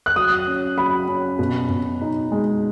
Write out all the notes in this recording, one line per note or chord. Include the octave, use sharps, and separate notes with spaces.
F#6
F#3 D#6
C#4
F#3 B5
C#4
B2
B2
D#4
G#3